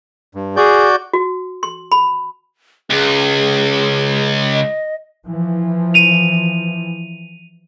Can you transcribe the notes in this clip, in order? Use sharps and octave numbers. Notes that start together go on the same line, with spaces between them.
G2
F#4 G#4 D5 G6
F#4
C6
B5
C#2 G#4
D#5
E3 F3
D#7 F7